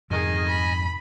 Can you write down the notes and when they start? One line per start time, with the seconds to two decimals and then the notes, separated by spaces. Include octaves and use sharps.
0.10 F2 G#2 C3 D#3 G#4 D#5 G#5
0.48 B5